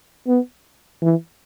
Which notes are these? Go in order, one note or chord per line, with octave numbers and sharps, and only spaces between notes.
B3
E3